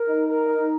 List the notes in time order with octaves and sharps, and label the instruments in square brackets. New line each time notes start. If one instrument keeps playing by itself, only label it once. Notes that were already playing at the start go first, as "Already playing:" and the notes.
Already playing: [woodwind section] A#4
D#4
A#4
D#4